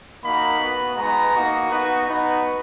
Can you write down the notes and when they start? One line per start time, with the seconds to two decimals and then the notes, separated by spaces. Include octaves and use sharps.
0.23 A#3 D#4 F#4 B5
0.60 B3 F#4
0.97 G#3 B3 D#4 A#5
1.34 A#3 D#4 F#4
1.71 B3 D#4 F#4 B4
2.08 B3 D#4 F#4 B4